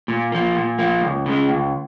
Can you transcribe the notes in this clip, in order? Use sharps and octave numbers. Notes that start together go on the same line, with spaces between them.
A#2
F3 A#3
A#2
F3 A#3
C#2
C#3 G#3
C#2